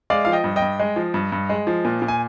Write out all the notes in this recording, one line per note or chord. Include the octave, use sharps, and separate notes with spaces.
G#3 D5 F5
F3 F5
D#5 G5
G2
D#5 G5
G2
G#3
F3
G2
G2
G#3
F3
A#2
A#2
G#5